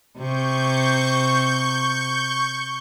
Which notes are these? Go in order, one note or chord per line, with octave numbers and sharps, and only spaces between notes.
C3 C#6 G6